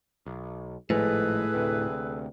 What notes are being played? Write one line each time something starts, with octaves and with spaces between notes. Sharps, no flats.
B1
G#1 A2 F3 G#3 G#4 A4 B4
D2 C3